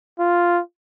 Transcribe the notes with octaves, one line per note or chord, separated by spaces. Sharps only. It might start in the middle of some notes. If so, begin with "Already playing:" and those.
F4